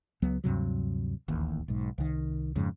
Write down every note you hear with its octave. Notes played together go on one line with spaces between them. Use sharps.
C#2 F#3 B3
D2 G2 C3 F#3
D1 A1 D#2
B1 G#2
C2 D#3
F2 G#2 C#3